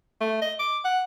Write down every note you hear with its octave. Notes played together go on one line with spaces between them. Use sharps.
A3
D#5
D6
F#5